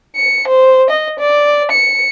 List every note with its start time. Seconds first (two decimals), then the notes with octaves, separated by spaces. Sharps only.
0.16 C#7
0.48 C5
0.90 D#5
1.19 D5
1.71 C#7